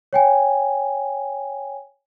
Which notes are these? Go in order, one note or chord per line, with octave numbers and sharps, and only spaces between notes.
C#5 G5 G#5